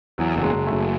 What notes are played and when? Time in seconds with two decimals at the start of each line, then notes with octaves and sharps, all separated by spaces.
0.18 E2 F#3
0.36 F#1 F#3
0.43 G#3
0.55 F#1
0.67 A3
0.73 F#1